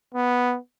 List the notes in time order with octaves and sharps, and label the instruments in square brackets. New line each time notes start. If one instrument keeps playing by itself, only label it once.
[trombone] B3